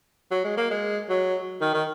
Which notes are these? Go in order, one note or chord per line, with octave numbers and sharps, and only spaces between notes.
F#3
G#3
A#3
G#3
F#3
D#3
D#3